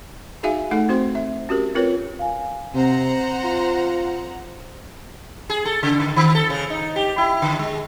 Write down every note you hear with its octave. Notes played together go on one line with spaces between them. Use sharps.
D#4 F#4 G#4 E5 F5 G#5
A3 D#4 A4 F#5
C4 F#4 C5 C6
E5
C#4 F#4 G4 A#4
C4 F4 A#4 B4 C#5
F5 G#5
C3 C4 C5 F#5 A#5
F4
G#4
A4
C#3
D3
D#3
A4
C#3
D#4
G4
E4
D3
G#3